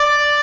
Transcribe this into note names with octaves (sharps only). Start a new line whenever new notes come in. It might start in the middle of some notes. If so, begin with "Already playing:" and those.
Already playing: D5